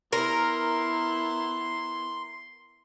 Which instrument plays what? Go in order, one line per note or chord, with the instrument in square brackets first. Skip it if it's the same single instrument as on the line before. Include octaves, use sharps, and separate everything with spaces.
[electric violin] B3 E4 [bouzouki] A#4 [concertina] C6